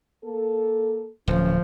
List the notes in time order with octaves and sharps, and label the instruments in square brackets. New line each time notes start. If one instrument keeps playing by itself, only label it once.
[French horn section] A#3 A4
[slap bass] D1 [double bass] F3 [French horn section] C#4